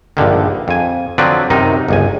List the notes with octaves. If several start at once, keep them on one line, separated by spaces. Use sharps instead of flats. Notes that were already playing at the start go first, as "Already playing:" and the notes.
A#1 G2 D3 D#3
F2 G#5
D3 F3 F#3 C4 B4 D5
F#2 C3 D#3 D#4
G1 C#2 G#5